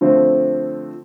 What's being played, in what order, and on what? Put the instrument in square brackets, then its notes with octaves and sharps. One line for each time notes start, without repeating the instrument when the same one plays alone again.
[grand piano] D3 F3 A3 C4